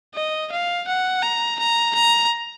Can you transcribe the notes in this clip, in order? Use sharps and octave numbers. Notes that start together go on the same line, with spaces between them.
D#5
F5
F#5
A#5
A#5
A#5